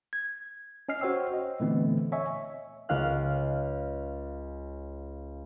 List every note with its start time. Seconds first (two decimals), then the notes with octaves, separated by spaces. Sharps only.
0.13 G#6
0.89 C#4 D#5 F6 C7
1.01 F#4 C5 C#5 G5 E6
1.33 D#5
1.60 A#2 D3 E3 A3 B3 C4
2.12 C#5 D#5 E5 G#5 C#6
2.89 C#2 C#4 F5 F#6